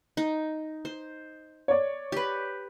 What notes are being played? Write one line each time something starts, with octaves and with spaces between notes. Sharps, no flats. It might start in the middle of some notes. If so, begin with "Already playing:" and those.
D#4
C5
C#5 D5
G4 B4